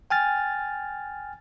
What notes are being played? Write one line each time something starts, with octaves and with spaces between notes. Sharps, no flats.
G5 G#5 F6 A6